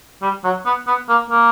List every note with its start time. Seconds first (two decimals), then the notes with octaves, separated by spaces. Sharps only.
0.22 G3
0.44 F#3
0.66 B3
0.87 B3
1.09 A#3
1.30 A#3